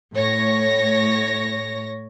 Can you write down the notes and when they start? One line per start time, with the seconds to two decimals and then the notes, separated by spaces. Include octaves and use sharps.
0.13 A2 C#5 A#6